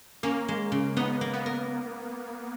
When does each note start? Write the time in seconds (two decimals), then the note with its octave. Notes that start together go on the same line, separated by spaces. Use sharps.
0.23 A#3 C#4
0.48 G#3
0.72 C#3
0.97 B3 D#4
1.21 A#3
1.34 B3
1.46 A#4